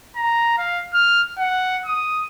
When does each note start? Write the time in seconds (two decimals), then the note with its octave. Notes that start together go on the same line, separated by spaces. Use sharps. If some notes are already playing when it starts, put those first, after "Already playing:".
0.16 A#5
0.58 F5
0.94 F6
1.38 F#5
1.86 D#6